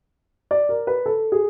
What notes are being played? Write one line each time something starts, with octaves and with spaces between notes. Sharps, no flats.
D5
A#4
B4
A4
G#4